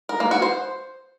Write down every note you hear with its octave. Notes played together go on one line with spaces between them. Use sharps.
A#4
A#3
F#4
C5